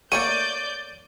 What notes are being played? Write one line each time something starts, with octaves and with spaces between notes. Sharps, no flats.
A3 A#3 A#4 C#5 D5 C#6 G6 D#7